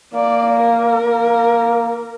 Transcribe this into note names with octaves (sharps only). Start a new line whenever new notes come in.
A#3 D5
A#4
A#3